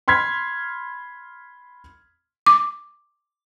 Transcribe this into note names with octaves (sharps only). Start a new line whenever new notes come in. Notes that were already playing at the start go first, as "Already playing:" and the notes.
B5 C6 F6 G#6 B6
D6